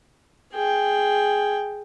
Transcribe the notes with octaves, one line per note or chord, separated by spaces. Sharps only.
G#4 G5